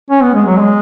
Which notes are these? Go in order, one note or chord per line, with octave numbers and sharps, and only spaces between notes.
C#4
B3
G#3
F#3
G#3